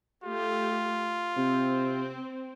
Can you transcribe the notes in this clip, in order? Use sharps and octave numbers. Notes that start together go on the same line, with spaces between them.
A3 F4 G4
C3 C4